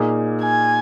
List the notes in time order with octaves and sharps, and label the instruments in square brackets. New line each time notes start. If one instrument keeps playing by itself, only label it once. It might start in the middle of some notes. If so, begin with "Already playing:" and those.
Already playing: [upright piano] A#2 A#3 D#4 G#4
[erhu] G#5